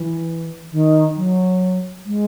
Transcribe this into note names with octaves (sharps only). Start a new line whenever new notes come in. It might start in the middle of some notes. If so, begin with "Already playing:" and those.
Already playing: E3
D#3
F#3
G#3